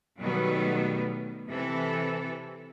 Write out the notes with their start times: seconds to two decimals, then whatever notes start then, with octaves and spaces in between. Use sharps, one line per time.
0.20 B2 D#3 F#3 G3 A3 B3
1.47 C3 E3 A4